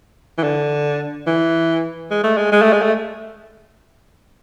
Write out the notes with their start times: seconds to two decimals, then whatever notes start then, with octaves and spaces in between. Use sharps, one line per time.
0.38 E3
0.43 D3
1.27 E3
2.11 G#3
2.24 A3
2.38 G#3
2.52 G#3
2.62 A3
2.73 G#3
2.82 A3